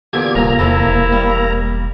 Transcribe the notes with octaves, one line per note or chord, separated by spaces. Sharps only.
E2 A#2 D3 G4 G#6
D1 C2 A#2 A#3 A#5
E2 C3 E4 A4
E1
G3